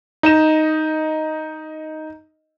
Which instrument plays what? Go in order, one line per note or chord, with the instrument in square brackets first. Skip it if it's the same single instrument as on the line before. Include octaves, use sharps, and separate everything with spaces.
[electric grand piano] D#4 D#5 E7